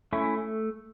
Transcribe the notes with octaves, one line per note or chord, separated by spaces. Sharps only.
A3 C#4 E4